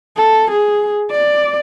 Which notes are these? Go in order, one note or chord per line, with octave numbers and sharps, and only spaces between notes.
A4
G#4
D5